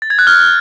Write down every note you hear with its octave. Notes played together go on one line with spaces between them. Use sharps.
A6
G#6
F#6
F6